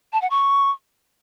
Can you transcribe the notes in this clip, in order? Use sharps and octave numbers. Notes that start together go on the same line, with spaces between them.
A5
F#5
C#6